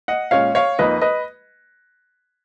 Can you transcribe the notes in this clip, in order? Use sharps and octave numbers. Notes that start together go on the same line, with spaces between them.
D#5 F#5
A#2 G#3 C#4 C#5 F5
C#5 F5
F2 F3 A#3 D#4 B4 D#5
B4 D#5